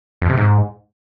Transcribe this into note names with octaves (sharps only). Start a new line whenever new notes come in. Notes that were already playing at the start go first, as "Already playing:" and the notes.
F2
C3
G#2